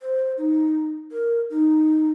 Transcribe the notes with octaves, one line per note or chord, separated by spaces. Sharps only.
C5
D#4
A#4
D#4